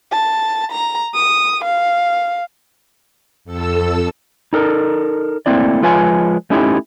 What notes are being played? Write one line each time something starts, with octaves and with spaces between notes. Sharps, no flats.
A5
A#5
D#6
F5
F2 A4 E6
D#4 A4 A#4
A3 A#3 C4 E4 D5
F3 G#3 F4 B4 C#5 G#5
A3 C#4 D#4 E4 G4